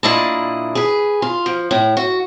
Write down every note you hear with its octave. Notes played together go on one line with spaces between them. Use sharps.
A#2 A#3 D4 E4 D#5 A5
G#4 B4
F4
F3
A2
F#4